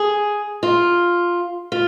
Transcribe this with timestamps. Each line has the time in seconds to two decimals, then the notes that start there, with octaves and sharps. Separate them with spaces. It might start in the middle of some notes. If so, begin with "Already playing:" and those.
Already playing: G#4
0.63 F4
1.72 F4